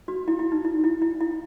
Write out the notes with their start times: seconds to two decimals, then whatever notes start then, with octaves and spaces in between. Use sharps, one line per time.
0.08 F#4
0.28 E4
0.39 E4
0.52 D#4
0.65 E4
0.84 E4
1.02 E4
1.21 E4